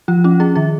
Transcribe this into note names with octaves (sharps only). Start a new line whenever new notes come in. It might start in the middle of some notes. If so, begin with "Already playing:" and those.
F3 F4
C#4 F4
C#4 G#4
D#3 G#4